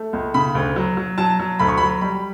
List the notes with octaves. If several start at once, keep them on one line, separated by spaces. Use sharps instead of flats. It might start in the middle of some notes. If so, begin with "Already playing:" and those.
Already playing: A3
C#2
C#3 B5
D2
F#3
F#3
F#3 A5
F#3
D2 B5
C#6
B5
F#3
G3 B5